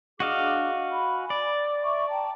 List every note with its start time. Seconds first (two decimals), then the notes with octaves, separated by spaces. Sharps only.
0.20 D4 F#4 G#4 D#5 F5 D6
0.92 G#5 B5
1.30 D5
1.81 E5 C#6 D6
2.09 G5 A5 A#5